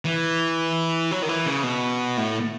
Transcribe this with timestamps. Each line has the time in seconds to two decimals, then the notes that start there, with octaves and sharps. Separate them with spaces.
0.05 E3
1.11 F#3
1.22 D#3
1.29 E3
1.46 C#3
1.64 B2
2.17 A2